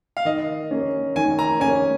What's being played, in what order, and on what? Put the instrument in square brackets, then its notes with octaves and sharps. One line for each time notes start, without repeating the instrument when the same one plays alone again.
[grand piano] F5
[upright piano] D#3 [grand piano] D#5
[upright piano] A#3 C#4
[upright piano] D#3 [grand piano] G#5
[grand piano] A#5
[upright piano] A#3 C#4 [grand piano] G#5